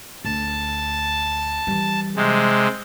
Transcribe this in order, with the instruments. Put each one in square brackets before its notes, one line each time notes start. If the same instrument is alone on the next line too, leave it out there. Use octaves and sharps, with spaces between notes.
[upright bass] D2 [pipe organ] A5
[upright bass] E3 G3
[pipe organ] C3 G#3